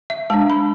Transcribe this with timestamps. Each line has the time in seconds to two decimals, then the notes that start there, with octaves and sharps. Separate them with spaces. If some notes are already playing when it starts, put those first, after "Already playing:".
0.10 E5
0.30 G#3 D4 A5
0.50 B5